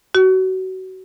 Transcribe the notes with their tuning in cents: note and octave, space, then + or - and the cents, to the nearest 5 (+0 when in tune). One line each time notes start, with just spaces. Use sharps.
F#4 +25